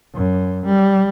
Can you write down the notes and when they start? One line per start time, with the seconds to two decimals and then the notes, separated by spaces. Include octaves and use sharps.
0.15 F#2
0.66 G3